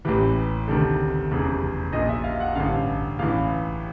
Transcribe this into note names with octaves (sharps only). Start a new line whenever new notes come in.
A1 A2 E3 G4
D2 C3 D#3 A4
F1 E2 C#3
A#1 A#2 D#5
E5
F5
F#5
A1 G2 D3 F5
A1 A2 E3 F5